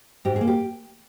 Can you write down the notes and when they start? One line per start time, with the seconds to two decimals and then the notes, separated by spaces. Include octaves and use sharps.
0.25 G#2 G4
0.36 G#4
0.41 A#3
0.47 G4